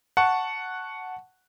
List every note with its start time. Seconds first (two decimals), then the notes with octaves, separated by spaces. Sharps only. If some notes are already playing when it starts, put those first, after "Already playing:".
0.17 F#5 A5 C#6